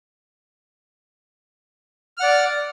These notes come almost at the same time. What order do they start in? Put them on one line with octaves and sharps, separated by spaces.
F6 F#5 D5